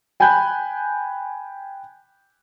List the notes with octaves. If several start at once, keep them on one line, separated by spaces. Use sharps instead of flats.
G5 G#5 B5 F#6 G6